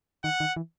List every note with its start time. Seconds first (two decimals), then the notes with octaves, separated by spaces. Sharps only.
0.24 D#3 F#5
0.40 D#3
0.56 E3